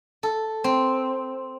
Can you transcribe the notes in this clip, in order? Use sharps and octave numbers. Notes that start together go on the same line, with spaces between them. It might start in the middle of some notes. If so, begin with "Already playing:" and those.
A4
C4